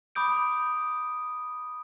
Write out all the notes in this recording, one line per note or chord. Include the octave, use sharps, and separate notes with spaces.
B5 D6 D#6 G6 D7